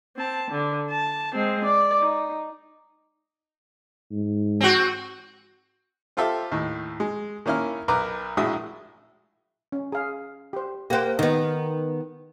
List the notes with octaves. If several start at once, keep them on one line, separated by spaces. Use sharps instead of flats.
C4 A5
D3
A5
G#3 C4
D5
D#4
G#2
C4 F#4
C4 F4 G4 A4 E5
D#2 A2
G#3
D#3 A#3 C#4 E4 F6
B1 A#4 B4 D6
A#1 A2 G#3 F#4 E5 D#6
C#4
G#4 F5
G4 C5
A#3 G4 C5 F#5 G5
D#3 B3 D#4